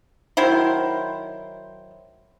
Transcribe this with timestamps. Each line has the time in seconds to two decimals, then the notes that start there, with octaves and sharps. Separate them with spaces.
0.37 D#3 F#3 E4 C5